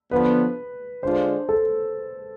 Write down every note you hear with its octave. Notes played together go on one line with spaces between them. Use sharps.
D3 F3 B3 B4
D3 G#3 D4 F4 C5
A4